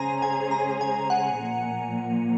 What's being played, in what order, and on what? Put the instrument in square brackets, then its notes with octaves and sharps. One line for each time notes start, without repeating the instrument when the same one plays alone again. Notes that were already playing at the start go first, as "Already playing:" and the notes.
Already playing: [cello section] C#3 G#3 C#4 G#4 C5 [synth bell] G#5 A#5
[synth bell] G#5
A#5
G#5
F#5
[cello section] A#2 F3 A#3